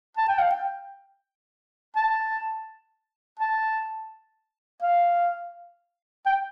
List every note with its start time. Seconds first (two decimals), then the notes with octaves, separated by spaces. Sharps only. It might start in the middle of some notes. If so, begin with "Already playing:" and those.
0.17 A5
0.28 G5
0.39 F5
0.50 G5
1.96 A5
3.39 A5
4.83 F5
6.26 G5